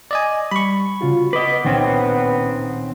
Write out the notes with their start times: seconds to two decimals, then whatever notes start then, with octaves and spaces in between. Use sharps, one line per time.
0.11 D5 D#5 G#5
0.51 G3 B5 C#6
1.01 C#3 F4 F#4
1.33 B3 B4 D#5 D6
1.65 C#2 A#2 D#3 C4 C#4